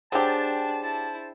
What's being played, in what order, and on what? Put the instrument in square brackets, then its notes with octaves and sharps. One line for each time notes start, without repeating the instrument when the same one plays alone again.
[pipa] F#3 G4 [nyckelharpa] D4 [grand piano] G#4 C5 G5 [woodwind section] A5
[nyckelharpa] E4